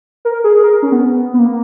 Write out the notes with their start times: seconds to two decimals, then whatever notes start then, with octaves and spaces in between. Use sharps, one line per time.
0.25 A#4
0.44 G#4
0.63 A#4
0.83 C#4
0.92 B3
1.34 B3
1.39 A#3